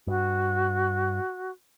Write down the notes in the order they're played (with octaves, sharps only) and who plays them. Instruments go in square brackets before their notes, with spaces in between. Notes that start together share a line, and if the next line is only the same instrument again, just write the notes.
[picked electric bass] G2 [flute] F#4